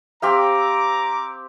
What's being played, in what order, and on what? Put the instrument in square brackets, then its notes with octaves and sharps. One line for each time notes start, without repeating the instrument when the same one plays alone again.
[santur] C4 G4 F5 [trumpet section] A#5 D6